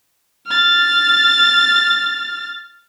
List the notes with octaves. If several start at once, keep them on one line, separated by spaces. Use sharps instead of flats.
F6 A6